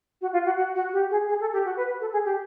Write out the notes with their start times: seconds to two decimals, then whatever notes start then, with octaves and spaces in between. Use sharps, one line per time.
0.21 F#4
0.33 F4
0.46 F#4
0.56 F#4
0.75 F#4
0.93 G4
1.10 G#4
1.29 G#4
1.41 A4
1.53 G4
1.66 F#4
1.77 B4
2.01 A4
2.13 G#4
2.25 G4